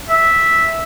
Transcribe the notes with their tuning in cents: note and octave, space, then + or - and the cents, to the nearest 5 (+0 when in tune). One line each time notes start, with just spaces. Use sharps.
E5 -10